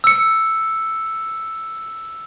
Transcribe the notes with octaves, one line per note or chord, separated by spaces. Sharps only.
E6 C#7